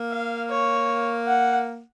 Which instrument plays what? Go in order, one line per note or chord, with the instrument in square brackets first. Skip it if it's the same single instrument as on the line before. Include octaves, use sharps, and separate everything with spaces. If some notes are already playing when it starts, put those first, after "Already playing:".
Already playing: [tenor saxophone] A#3
[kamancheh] F5
C#5
F#5